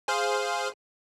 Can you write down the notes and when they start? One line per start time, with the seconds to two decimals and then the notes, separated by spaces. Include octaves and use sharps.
0.08 G#4 C5 F5